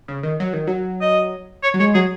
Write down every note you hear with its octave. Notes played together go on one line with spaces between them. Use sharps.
C#3
D#3
F#3
D#3
F#3
D#5
C#5
F#3
G#3 C#5
F#3 G#4